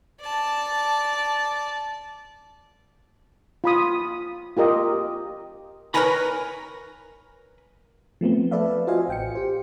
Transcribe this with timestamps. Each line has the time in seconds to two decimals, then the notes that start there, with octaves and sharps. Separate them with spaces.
0.21 D5 A5
3.64 F4 B5 D#6
4.57 F4 G4 A#4 D#5
5.94 A#4 B4 C#5 G#5 A#5 B5
8.21 F3 A3 B3 C4
8.51 A4 B4 D5 E5 F5
8.87 F4 F#4 C5 D#5 F5 G#5
9.08 A1 G5 C#7
9.35 G4 C5